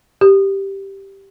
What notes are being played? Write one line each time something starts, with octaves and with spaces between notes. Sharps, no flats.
G4